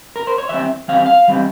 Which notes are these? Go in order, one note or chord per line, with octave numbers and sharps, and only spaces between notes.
A#4
C5
C#5
E3 G3 C4 E5
E3 G3 C4 F5
F5
E3 G3 C4